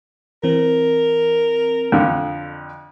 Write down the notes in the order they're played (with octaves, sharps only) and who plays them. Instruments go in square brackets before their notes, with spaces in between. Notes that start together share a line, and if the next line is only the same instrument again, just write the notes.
[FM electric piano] E3 C4 [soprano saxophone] A#4
[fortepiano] F2 D3